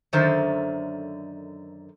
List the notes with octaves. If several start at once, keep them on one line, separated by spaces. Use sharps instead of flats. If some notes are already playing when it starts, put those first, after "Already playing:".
F#2 D3 D#3 A4 C5 E5